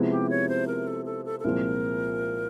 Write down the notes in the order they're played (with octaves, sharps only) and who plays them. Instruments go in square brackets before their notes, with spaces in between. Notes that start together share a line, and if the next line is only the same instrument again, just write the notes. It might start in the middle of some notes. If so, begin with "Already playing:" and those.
Already playing: [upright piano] C3 F3 G#3 B3 E4
[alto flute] G4
C#5
C5
A#4
A4
A4
A4
A4
[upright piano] C2 A#2 F3 G#3 C4 [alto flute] A#4